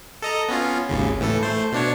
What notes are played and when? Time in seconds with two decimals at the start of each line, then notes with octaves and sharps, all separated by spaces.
0.22 A4 D#5 A#5
0.49 B3 C#4 F4
0.89 G#1 D#2 C#3
1.21 A2 E3 A4
1.43 A3 C5
1.72 B2 D4 C#5